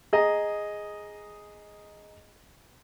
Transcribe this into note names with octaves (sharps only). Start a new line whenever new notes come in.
G#4 D#5 A#5